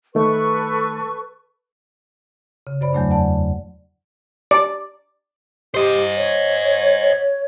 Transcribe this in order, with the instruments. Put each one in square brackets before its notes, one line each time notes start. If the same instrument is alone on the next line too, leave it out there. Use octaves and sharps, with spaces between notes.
[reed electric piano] D#3 A3 [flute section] A4 B4 C#6
[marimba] C#3
F#2 C5 D5 B5
E2 F#3 A3 D4
D5 F#5 A5
[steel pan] D5
[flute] G4 [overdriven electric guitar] C5 D#5
[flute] C#5